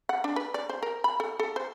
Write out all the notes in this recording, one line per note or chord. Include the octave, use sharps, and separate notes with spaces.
F#5
D4
B4
D5
C5
A#4
B5
A4
A4
C5